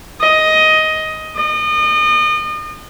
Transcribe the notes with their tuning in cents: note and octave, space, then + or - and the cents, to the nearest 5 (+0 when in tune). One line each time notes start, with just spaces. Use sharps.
D#5 +10
D#5 -35